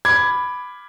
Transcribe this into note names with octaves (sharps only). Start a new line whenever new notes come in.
B5 D6 G#6